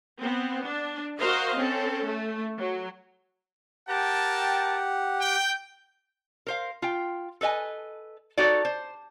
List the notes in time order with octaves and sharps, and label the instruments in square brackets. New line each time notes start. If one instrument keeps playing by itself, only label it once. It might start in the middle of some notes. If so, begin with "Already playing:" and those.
[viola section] B3 C4
D4
F#4 A#4 C5 D#5 F5
C4 C#4 A4
A3
F#3
[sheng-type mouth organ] G4 F#5 [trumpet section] A#4 G5 A5
[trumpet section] G5
[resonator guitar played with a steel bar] A#4 C5 F5
F4 G5
A4 B4 D#5 G#5
D#4 F#4 A4 C#5 D5
C5